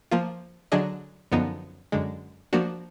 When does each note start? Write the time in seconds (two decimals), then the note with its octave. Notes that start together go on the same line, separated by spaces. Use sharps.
0.11 F3 A#3 F4
0.72 D3 F#3 D4 G#4 D#5
1.32 F#2 D3 F3 B3 D#4
1.92 F#2 D3 G#3
2.53 F3 A#3 D4 F#4